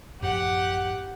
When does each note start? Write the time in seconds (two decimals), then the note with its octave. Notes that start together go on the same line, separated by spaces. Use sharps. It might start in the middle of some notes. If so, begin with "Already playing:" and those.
0.21 A1 F#2 F3 G4 F#5